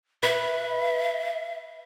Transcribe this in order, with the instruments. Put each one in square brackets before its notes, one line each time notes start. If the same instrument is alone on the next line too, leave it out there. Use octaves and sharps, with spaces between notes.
[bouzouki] B4 [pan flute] E5